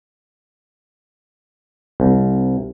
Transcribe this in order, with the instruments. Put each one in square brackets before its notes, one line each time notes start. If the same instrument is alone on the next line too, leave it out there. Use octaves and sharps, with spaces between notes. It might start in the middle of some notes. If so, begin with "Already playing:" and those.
[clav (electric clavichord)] C2